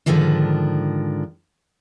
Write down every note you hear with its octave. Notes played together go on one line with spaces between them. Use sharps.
G#2 D3 D#3 F3 D4